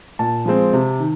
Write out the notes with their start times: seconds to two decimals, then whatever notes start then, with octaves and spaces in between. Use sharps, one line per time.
0.19 A#2 A5
0.46 F3 G#3 C4
0.73 C3
1.00 D#3